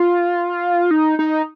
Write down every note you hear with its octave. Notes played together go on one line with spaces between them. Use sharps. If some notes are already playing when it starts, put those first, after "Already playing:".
Already playing: F4
D#4
D#4